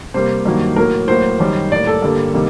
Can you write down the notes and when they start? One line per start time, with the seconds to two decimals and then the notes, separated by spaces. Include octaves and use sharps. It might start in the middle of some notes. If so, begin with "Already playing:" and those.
0.14 C3 G3 A#3 C5
0.45 G2 D#3 F#3 A#3
0.76 A2 F#3 A#3 A#4
1.08 A2 F#3 A#3 C5
1.40 F#2 D#3 G3
1.72 A2 G3 A#3 D5
1.87 A4
2.02 G2 D3 G3 A#3
2.34 C3 D#3 G3 A#3